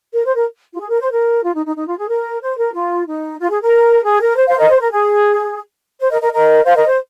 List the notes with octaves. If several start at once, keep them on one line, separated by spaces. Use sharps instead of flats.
A#4
C5
A#4
F4
G#4
A#4
C5
A#4
F4
D#4
D#4
D#4
F4
G#4
A#4
C5
A#4
F4
D#4
F4
G#4
A#4
G#4
A#4
C5
C5 F5
A#4 D#5
C5
A#4
G#4
C5
A#4 D#5
A#4 D#5
A#4 D#5
C5 F5
A#4 D#5
C5